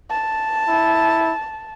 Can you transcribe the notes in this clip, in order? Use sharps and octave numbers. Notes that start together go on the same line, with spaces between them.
A5
E4